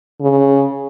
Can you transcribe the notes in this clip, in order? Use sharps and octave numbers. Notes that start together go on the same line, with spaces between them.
C#3